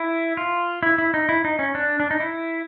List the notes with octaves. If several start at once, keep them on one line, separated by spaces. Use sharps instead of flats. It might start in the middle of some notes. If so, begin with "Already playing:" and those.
Already playing: E4
F4
E4
E4
D#4
E4
D#4
C#4
D4
D4
D#4
E4